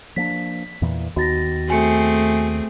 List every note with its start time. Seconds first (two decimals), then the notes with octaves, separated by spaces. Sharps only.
0.16 F3 A#3 D4 B6
0.82 E2 A#2 E3
1.16 D#2 D#3 B3 F#4 A6 A#6
1.68 A3 C4 F#4 G#4 G#5 C#7